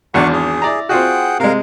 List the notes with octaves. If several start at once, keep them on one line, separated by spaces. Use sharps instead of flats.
G#1 E2 D4 F#5 C#6
G#4
E4 D5 A#5
C4 F4 F#4 G#4 F#5 G5
C3 G#3 A#4 F5